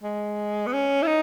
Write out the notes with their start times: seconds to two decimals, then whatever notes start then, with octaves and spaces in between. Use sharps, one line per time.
0.03 G#3
0.67 B3
0.73 C#4
1.03 E4
1.07 D#4